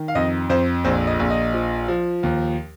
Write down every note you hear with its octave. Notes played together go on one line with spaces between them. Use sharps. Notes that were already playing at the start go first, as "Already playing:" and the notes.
Already playing: D#3
F5
F2 D#5
F2 C5
A#1 C5
D#5
A#1
D#5
F3
F3
D#2